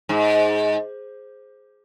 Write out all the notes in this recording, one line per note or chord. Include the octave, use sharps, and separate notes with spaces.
G#2